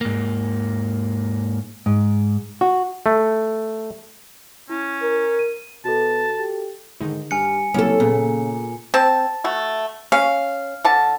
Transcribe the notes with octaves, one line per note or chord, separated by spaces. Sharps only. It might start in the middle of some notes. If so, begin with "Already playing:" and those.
G#2 A#3
G#2
F#4
A3
C#4 E4
A#4
D#7
B2 F#4 A4 A5
G4
G#2 D3 D#3 D#4
G2 G#5 F6 C#7
C2 C#3 F#3 A#3 C#4 A4
A#2 C#3 B3
C4 A5
A3 F#4
C#4 F5
D3 A5